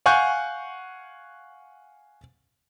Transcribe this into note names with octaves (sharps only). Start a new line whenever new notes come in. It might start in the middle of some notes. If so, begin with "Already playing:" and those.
F5 F#5 G#5 C#6 F#6 G6